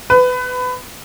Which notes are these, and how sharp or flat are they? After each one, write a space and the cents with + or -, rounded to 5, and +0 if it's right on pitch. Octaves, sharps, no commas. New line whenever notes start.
B4 +25